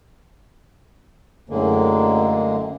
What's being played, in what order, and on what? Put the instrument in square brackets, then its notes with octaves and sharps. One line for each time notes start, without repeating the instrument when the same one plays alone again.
[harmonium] F#2 A2 D3 G#3 A#3